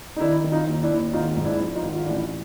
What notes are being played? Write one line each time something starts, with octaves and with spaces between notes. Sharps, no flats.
D#4
D#3 D4 E4
D#3
D#4 F4
D#2
D4 E4
D#2
G#1 D#4 F4
G#2
D4 E4
F3
D#4 F4
G#1
F4
A1 D4 E4